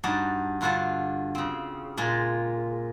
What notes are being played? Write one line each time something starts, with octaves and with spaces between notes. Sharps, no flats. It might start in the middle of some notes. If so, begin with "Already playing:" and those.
G2 D#4 F#4 D5 A5
G2 D3 F4 F#4 F#5 A5
C#3 C4
A#2 G#3 F4